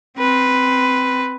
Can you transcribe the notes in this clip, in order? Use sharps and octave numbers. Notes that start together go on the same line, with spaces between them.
C4 B4